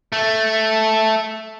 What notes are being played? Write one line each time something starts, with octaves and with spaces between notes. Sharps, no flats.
A3